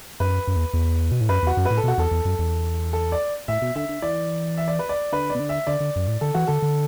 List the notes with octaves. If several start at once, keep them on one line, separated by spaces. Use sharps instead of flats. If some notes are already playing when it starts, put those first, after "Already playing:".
F#2 B4
F#2
E2
E2
B2
A2
F#2 B4
E2 F#4
F#2
B4
A2
A4
B2 F#4
E2 A4
E2
F#2
E2
A4
D5
A2 E5
B2
D3 E5
D3
E3 D5
E5
D5
B4
D5
D3 B4
B2 D5
D3
E5
D3 D5
D3
F#2
A2
D3 A4
E3 F#4
D3 A4
D3